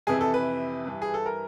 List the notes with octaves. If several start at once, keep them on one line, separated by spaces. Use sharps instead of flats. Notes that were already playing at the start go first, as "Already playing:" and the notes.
F2 C3 E3 G#4
A4
B4
G2 E3
G#4
A4
A#4